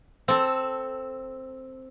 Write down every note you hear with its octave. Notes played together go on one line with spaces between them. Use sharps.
C4 A4